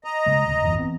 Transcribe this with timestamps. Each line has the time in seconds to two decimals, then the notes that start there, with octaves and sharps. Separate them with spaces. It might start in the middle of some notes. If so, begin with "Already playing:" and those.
0.04 D#5 A#5
0.26 C#3 G#3
0.46 D1 D2
0.62 G#1 F2 E3
0.78 E3 B3 C4